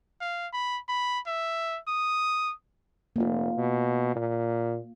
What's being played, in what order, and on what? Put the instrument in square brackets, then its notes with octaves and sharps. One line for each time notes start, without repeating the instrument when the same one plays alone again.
[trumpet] F5
B5
B5
E5
D#6
[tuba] F1 [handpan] A#3 F4
[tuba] B2
A#2